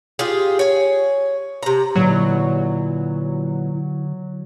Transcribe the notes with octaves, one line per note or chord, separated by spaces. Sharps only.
F4 G4 G#4
C#5 G#5
C3 A#5
A#2 D3 E3 F#3 D#4